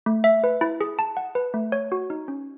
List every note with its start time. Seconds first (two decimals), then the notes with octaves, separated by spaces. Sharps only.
0.06 A3
0.24 E5
0.44 B4
0.61 E4
0.81 G#4
0.99 A5
1.17 F#5
1.35 B4
1.54 A3
1.72 C#5
1.92 F#4
2.10 D#4
2.28 C#4